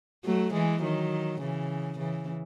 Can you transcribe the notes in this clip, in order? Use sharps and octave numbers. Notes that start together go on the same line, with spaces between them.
F#3 A3
E3 G#3
D#3 F#3
C#3 E3
C#3 E3